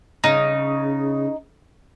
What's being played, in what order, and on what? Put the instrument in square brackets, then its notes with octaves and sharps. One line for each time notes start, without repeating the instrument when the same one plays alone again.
[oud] C#3 [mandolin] D#4